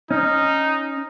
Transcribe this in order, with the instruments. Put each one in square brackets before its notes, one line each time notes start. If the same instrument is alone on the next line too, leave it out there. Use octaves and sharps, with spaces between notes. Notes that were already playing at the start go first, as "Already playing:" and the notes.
[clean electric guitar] C#4 [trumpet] D#4